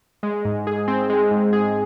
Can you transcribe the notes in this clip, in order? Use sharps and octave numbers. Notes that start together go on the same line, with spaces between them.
G#3
G#2
G#4
C4
G#3
G#2
G#4